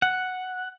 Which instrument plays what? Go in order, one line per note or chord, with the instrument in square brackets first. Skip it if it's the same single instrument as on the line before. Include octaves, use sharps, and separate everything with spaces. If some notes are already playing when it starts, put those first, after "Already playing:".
[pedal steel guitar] F#5